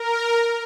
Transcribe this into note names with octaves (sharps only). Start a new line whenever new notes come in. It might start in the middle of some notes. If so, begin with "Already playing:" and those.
Already playing: A#4